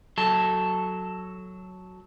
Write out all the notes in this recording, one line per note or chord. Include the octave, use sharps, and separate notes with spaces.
F#3 A4